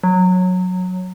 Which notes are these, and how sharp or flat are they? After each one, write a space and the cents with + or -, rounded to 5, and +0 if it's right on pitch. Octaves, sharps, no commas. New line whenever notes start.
F#3 -15